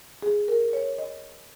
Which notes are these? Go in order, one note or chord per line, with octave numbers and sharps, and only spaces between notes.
G#4
A#4
C#5
D#5